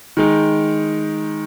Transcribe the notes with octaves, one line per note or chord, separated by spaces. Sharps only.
D#3 G#3 D#4